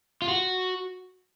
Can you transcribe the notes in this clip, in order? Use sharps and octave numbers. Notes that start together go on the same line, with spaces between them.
F4
F#4